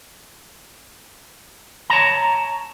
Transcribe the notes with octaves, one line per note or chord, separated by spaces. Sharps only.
C#5 A5 A#5